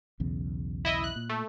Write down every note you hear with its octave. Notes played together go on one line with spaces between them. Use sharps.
B1 E2 C#3
E4 D#5 E5
F#6
A#2
A3